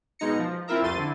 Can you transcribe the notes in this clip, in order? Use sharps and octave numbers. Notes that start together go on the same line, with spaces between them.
B2 G#3 D#4 A#6 C#7
F3
C4 E4 F4 A#4 E5 A#5
C2 F2 A3 C6 A6 D#7
D3 A3 E4